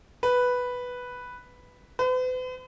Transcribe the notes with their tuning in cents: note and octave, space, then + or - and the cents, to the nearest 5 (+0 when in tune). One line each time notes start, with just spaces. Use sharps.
B4 +0
B4 +45